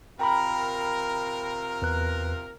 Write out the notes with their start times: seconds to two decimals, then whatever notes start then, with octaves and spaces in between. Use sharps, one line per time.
0.19 C3 F4 A#4 G5 A#5 B5
1.82 E2 B4 F#6